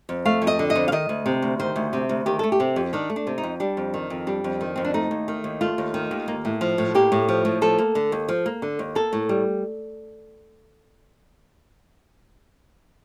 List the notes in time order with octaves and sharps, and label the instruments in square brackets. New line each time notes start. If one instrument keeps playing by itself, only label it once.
[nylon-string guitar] F2
A3 F5
F2
D#5
D3
D#5
F2
F5
D#3 D#5
D2
C3
D2
D#3 C5
D2
C3
D2
D#3 G4
A3 A4
G4
C3
F2
D#3 D4
A3
D4
C3
D#4
F2
G3 D4
F2
D#3
F2
G3 D4
F2
D#3
F2 C4
D4
A3 D#4
D#2
D#3
D#2
A3 F4
D#2
D#3
D#2
A#3
A2
F3
A2
A#3 G4
A2
F3
A2
F3 A4
A#3
D3
D#2
F3
A#3
D3
D#2
A#3 A4
A2
G3